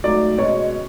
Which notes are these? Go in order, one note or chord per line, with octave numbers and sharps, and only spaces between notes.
G#2 F#3 A3 D5
B2 G#3 C#4 C#5